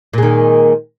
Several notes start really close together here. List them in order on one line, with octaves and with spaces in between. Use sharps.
A#2 G#3 D#3